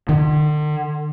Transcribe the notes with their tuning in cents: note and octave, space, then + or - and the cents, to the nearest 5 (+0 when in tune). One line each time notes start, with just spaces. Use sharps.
D3 +45